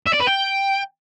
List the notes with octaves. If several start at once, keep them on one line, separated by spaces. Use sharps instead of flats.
E5
D5
B4
G5